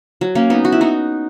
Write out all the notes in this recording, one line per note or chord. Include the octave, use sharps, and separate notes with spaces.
F#3
A#3 C#4
B3 D#4
F#4
E4
D#4 F#4